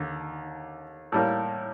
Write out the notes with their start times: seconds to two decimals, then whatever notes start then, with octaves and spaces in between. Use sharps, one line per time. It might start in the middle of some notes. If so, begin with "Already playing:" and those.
Already playing: D#2 D3
1.12 A2 G3 A#3